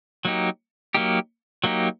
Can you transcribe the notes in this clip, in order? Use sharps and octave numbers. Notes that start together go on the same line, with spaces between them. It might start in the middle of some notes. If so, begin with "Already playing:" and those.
F#3 A#3 D#4 G4
F#3 A#3 D#4 G4
F#3 A#3 D#4 G4